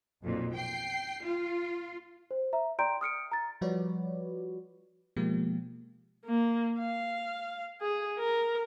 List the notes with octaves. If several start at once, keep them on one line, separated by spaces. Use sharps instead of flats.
B1 F2 A#2
G5 C7
F4
C5
E5 A#5
D5 G5 A#5 C6 G6 D7
D#6 F6 C#7 D7
A#5 A6
F3 G3 F#4 B4 C#5 D5
B2 F3 G#3 A#3 G4
A#3
F5
G#4
A#4